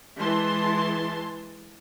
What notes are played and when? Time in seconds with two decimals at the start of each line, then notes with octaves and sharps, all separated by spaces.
0.17 E3 G#3 A5 C6